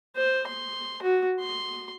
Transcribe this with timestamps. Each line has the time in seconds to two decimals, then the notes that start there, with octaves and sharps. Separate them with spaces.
0.17 C5
0.47 C6
1.02 F#4
1.40 C6